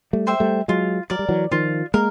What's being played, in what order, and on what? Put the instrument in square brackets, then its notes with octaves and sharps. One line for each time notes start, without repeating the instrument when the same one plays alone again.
[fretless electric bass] G3 A3
[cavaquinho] C5 E5 G5
[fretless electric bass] G3 A3
[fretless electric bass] F#3 G#3 [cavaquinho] F4
[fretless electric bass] F#3 [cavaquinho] A#4 D5
[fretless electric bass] G3
E3 F#3
[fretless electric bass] D#3 F3 [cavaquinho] F4
[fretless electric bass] G#3 A#3 [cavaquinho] A#4